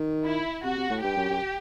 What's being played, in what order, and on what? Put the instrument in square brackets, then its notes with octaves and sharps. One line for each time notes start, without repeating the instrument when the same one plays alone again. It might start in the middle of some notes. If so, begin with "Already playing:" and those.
Already playing: [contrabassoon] D#3
[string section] E4
[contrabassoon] C3 [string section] F#4
[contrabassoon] C3
A2
[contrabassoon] G2 [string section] G4
[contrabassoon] F#2
F#2